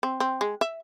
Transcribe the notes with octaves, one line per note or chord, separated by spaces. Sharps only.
C4
C4
G#3
E5